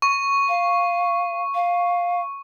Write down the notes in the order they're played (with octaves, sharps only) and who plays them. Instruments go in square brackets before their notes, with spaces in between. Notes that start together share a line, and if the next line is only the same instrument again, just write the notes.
[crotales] C#6
[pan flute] F5
F5